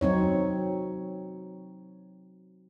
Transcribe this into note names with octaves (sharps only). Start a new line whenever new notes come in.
F#3 C4 D#4 C#5